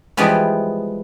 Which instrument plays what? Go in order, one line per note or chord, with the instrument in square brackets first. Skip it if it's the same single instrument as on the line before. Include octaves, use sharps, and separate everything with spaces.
[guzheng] E3 F3 G3 G#3 B3